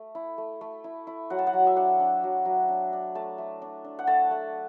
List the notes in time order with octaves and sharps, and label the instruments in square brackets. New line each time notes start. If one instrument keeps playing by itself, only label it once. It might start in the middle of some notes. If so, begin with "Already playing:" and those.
Already playing: [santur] A3
E4
A3
A3
E4
E4
F#3 F#5
A5
F#5
F#3
E5
D4 F#5
D4
F#3
F#3
D4
D4
A3 A5
A3
D4
D4
F#5
A3 A5
A3